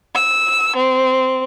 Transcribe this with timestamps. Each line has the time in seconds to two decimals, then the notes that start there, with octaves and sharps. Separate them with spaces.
0.15 E6
0.76 C4